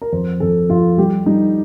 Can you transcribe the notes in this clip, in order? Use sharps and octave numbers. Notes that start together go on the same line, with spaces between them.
A#4
F2 C5
F2 A4
F2 F4
G3 G4
G3 D#4